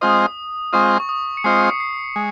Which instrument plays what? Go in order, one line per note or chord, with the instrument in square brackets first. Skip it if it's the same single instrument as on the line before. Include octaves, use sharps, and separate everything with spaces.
[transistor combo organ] G#3 C4 F4 C5 D#5 [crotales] D#6
[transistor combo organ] G#3 C4 F4 C5 D#5 [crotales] C#6
[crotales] C#6
D#6
C#7
[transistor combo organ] G#3 C4 F4 C5 D#5 [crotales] C7
[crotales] C#7
C7
[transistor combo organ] G#3